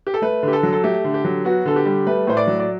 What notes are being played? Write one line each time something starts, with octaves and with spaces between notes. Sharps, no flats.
G4
A4
A3 B4
D3 G4
A4
F#3
A4
A3 G4
D3
G4
F#3
B3 F#4
D3 A4
G4
G3
A3 B4
A2 C5
D5
F#3
D5